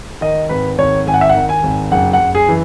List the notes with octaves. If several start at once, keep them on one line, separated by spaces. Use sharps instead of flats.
D#3 D#5
G#1 B4
G#1 C#5
G#1 G#5
F#5
E5
F#5
D#3
G#5
G#1
F#1 F#5
F#5
F#1
G#4
E3